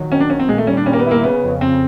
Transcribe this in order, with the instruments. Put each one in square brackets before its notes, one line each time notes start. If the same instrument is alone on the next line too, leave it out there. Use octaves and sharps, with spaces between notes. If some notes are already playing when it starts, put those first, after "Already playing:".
Already playing: [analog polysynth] A#1 D#3 F#3
[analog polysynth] D#3 [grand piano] C#4
[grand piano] D4
[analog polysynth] D#3 [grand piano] C#4
[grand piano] C4
[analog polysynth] A#2 [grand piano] G#3
[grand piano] A3
[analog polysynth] G3 [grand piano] C#4
[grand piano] D4
[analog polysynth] A#2 [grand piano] C#4
[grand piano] A#3
B3
[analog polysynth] E4
[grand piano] A#3
[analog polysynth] C#3 [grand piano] B3
[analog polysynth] F2
[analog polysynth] F2 [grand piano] C4